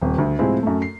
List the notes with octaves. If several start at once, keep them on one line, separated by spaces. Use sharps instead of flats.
D#1 C3
D2
A2 C3 F3 G#3 C4 E4
F#2 A3
C7